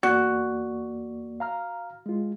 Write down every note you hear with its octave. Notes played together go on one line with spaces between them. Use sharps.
E2 A#3 F#4 D5
F5 A#5 F6
G#3 F4